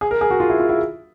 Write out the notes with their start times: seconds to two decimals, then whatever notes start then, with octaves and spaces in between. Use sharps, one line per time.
0.01 G#4
0.11 A#4
0.21 G#4
0.31 F#4
0.40 F4
0.50 E4
0.60 F4
0.69 E4